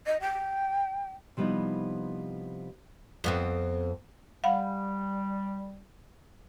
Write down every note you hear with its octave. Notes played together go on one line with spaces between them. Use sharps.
D#5
G5
C3 F3 G3 B3 D#4 E4
F2 B3 C4
G3 F5 F#5 B5